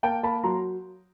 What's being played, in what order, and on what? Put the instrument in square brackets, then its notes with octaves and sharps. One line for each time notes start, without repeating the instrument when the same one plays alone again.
[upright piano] A#3 G5 A5
A#3 A5 B5
F#3 A#5 C6